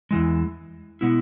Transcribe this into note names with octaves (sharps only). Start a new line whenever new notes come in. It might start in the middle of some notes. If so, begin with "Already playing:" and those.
E2 C#3 E3 G#3
B2 G#3 B3 E4